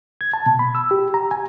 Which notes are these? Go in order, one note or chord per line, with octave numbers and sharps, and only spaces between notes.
G#6
A5
B2
B5
E6
G4
A#5
G#5